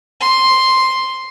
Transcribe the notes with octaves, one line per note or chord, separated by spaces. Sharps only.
C6